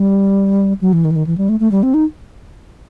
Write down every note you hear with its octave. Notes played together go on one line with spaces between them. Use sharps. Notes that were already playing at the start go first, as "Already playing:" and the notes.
Already playing: G3
F#3
E3
D#3
E3
D#3
E3
G3
A3
A3
G3
C4
D#4